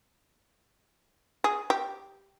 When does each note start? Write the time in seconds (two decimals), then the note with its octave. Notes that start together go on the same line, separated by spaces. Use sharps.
1.44 G#4
1.70 G4